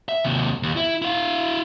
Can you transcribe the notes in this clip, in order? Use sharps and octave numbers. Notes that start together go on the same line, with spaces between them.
E5
D#2 C3
D#2
E4
E4 F5